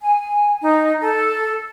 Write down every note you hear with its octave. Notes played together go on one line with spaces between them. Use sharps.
G#5
D#4
A4